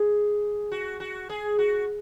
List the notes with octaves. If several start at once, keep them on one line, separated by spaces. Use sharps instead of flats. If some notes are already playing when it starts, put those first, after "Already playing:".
Already playing: G#4
F#4
F#4
G#4
F#4